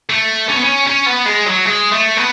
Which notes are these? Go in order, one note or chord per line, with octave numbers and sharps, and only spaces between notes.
A3
C#4
B3
C#4
C#4
B3
G#3
F#3
G#3
A3
B3